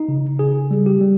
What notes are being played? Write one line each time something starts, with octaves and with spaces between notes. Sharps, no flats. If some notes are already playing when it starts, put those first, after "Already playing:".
Already playing: D#4
C#3
C#3 G#4
G3
G4
G3